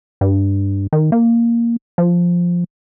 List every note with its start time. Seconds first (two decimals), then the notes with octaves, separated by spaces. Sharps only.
0.21 G2
0.93 D#3
1.12 A#3
1.98 F3